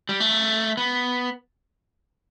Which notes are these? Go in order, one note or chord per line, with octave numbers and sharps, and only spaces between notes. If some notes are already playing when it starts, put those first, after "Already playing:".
G3
A3
B3